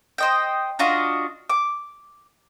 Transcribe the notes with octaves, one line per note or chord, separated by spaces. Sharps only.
C5 D#5 G5
D4 F4 F#4 D#5
D6